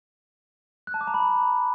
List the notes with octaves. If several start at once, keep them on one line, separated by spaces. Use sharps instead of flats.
F#6
A5
D6
A#5
B5